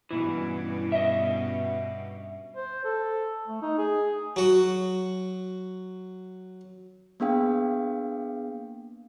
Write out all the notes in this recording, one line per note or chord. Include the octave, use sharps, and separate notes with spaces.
G2 B2 E3 C#4
D#5 E5
C5
A4
A3
D#4
G#4
F#3 F#4
A#3 B3 D4 G#4 F5 G5